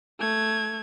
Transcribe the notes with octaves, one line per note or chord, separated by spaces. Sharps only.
A3 G#6